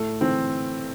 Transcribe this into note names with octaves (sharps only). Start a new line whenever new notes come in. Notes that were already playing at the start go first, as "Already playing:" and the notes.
Already playing: A2 A3
E3 C4